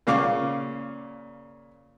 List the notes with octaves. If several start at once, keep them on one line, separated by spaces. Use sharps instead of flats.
A#2 C#3 F5 D6